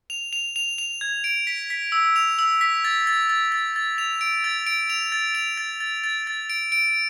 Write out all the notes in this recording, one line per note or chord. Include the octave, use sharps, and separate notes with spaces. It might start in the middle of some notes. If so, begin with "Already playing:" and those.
F7
F7
F7
F7
G#6
D7
B6
B6
E6
F7
E6
B6
A6
A6
A6
A6
A6
F7
D7
A6
D7
F7
A6
F7
A6
A6
A6
A6
D7
D7